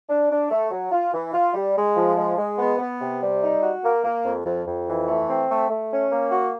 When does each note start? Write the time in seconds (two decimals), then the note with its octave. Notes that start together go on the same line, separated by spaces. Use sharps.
0.09 D4
0.30 D4
0.50 A3
0.71 F#3
0.92 F4
1.13 E3
1.33 F4
1.54 G3
1.76 G#3
1.96 F3
2.16 G#3
2.37 G#3
2.58 B3
2.78 B3
3.00 C3
3.21 G3
3.42 D#4
3.62 F#4
3.82 A#3
4.04 A#3
4.25 F2
4.45 F2
4.66 F2
4.87 E3
5.08 A3
5.28 C4
5.49 A3
5.69 A3
5.91 C#4
6.12 A#3
6.31 F#4